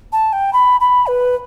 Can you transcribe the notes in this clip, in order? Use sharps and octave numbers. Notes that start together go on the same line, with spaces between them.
A5
G5
B5
B5
B4